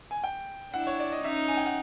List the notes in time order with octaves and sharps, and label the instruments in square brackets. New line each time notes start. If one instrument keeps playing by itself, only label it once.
[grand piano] G#5
G5
[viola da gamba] D4 E4 [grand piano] F#5
[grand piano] C#5
D5
D#5
[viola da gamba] C#4 D#4 [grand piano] E5
[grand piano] G#5
G5
F#5